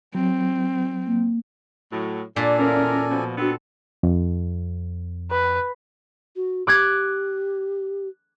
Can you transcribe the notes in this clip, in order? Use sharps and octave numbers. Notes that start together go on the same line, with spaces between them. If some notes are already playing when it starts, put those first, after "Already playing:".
F#3 C4
A#3
A2 F#3
A#2 D4 A4 D5 G#5
E2 C#4 E4 A#4
B2 F3
B3 C4 D4 F#4 A4
F2
B4
F#4
G4 D6 F#6 G#6